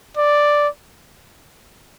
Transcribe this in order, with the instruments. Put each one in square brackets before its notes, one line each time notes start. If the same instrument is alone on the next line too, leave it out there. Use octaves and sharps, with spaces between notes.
[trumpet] D5